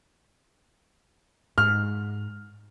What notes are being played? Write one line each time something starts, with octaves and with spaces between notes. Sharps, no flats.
G#2 F6